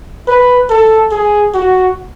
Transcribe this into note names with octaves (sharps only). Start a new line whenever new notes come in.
B4
A4
G#4
F#4